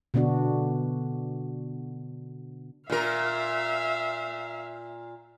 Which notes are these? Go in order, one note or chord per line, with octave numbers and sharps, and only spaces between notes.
B2 D3 B3 D4 F#4
A#2 A#4 E5 F5